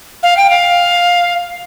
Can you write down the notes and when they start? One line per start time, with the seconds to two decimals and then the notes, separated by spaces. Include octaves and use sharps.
0.23 F5
0.37 G5
0.50 F5